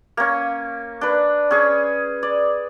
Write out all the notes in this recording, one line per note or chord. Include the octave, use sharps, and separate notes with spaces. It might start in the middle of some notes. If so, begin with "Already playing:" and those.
A#3 C#4
D4 B4
C#4 G#4
D5